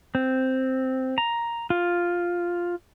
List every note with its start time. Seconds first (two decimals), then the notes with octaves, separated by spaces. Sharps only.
0.15 C4
1.18 A#5
1.70 F4